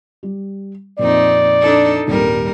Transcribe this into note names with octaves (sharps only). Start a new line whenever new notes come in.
G3
F2 A#2 C4 D#4 D5
D4 D#4 A4
D#1 G#1 G3 A#4